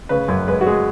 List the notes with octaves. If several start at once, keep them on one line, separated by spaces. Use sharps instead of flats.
C#3 B4
F#2
G#3 B4
F#4
G#3 G#4